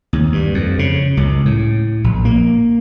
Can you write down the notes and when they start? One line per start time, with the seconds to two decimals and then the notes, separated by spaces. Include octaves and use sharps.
0.13 D#2
0.32 G2
0.55 F2
0.79 C#3
1.17 C#2
1.45 A2
2.04 A#1
2.25 A#3